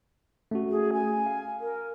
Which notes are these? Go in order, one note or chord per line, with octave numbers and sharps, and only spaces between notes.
A3 C#4 F#4
G#4
G#5
F5
A#4